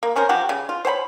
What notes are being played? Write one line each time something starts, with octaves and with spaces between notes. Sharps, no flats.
A#3
C4 C#4 A#4 C5
F3 F#3 F#4 G4
C#3
F4
C5 C#5 G5 B5